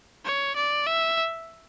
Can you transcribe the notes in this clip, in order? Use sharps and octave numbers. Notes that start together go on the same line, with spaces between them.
C#5
D5
E5